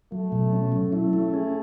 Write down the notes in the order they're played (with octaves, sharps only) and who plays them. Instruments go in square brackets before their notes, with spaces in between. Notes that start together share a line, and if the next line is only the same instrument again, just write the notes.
[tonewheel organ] F#3 [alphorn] A3
[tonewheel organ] B2
C#4
F#3
[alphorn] A3 [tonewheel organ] E4
[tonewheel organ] C#4
G#4